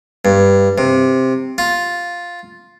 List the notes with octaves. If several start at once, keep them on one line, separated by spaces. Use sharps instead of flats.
G2
C3
F4